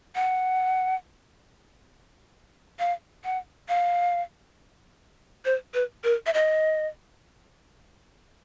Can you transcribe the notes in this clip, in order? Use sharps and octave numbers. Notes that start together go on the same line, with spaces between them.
F#5
F5
F#5
F5
C5
B4
A#4
E5
D#5